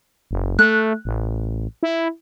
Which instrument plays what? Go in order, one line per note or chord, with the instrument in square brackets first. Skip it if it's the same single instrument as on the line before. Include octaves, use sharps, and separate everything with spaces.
[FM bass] F#1
[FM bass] A3 [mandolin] F#6
[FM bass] A1
E4